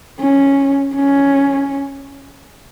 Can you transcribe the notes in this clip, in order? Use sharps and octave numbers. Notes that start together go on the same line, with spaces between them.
C#4
C#4